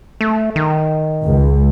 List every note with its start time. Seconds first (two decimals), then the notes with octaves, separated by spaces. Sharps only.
0.21 A3
0.56 D#3
1.24 C#2